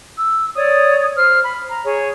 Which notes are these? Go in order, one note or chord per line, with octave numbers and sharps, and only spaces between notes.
E6
C#5 D5 D#6
C5 F6
B5
A#5
G#4 C#5